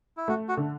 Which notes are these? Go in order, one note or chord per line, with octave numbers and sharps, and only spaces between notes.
E4
A3 F#4
F#4
D3